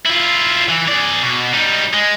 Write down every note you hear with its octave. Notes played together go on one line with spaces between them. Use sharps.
E4 F4
E3
G#4 D5
B2
G3 D#4
G#3